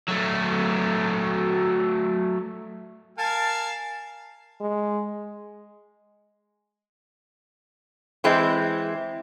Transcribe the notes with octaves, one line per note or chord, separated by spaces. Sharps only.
F#3 A3
A#4 F5 G#5 A5
G#3
E3 G#3 C4 E4